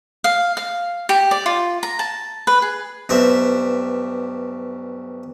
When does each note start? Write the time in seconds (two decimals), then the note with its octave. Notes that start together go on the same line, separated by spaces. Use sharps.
0.24 F5
0.57 F5
1.09 G4
1.31 D5
1.46 F4
1.83 A#5
1.99 A5
2.47 B4
2.62 G#4
3.09 B1 G2 C4 E5